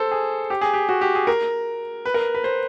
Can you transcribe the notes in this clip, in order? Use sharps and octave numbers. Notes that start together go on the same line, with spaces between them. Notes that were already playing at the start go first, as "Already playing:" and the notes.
Already playing: A4 C5
G#4
G4
G#4
G4
F#4
G4
G#4
A#4
B4
A#4
B4
C5